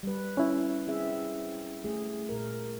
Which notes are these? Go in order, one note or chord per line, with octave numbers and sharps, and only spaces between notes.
G3 B4
C#4 E4
C4 G#4 E5
A3 G#4
A#2 A#4